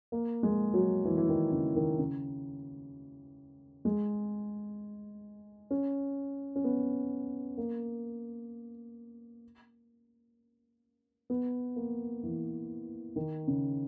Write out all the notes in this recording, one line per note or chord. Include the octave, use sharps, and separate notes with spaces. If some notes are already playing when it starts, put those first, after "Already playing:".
A#3
G#3
F#3
E3
E3
D#3
C#3
D#3
C#3
G#3
C#4
C#4
B3
A#3
B3
A#3
E3
D#3
C#3